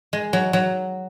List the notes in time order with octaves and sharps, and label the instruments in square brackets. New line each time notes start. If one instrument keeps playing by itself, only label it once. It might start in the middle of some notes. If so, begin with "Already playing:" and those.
[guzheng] G#3
F#3
F#3